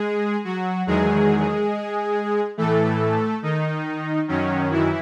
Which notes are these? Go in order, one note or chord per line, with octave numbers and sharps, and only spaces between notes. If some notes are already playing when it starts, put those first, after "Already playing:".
Already playing: G#3 G#4
F#3 F#4
E2 D#3 F#3 G#3 G#4
A2 E3 A3 A4
D#3 D#4
F#2 D#3 F#3 C#4
E3 E4